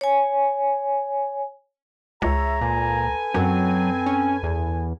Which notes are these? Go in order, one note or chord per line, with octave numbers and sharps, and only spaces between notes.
C#5 G#5
C#2 G#4 C#5 E5 A#5
A#2 A4 B4 G#5
F#2 F#3 C4
C#4
E2